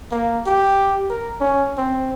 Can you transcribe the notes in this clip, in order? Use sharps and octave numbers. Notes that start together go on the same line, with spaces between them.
A#3
G4
A#4
C#4
C4